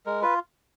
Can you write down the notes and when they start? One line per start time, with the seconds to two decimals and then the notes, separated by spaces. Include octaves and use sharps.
0.06 G#3 A#4
0.22 F4 B4